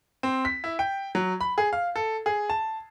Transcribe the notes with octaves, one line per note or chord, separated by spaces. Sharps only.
C4
B6
E4
G5
F#3
B5
G#4
F5
A4
G#4
A5